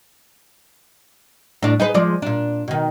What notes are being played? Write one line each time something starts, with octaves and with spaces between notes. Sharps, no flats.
A2 D4
D#4 G#4 B4
F3 G#3 D5
A#2 D4
B2 D#3